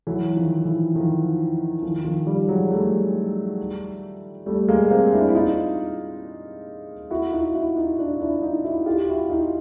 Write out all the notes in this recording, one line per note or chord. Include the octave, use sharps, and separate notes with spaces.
E3 F#3
D#3 F3
E3
D#3 F3
D#3 F3
D#3 F3
F3 G3
F#3 G#3
G3 A3
G3 A3
G#3 A#3
A#3 C4
D4 E4
E4
D#4 F4
E4 F#4
D#4 F4
E4 F#4
D#4 F4
D4 E4
D4 E4
D#4 F4
E4 F#4
F4 G4
E4 F#4
D#4 F4